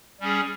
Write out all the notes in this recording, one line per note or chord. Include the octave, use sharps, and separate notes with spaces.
G3 C#4 G#4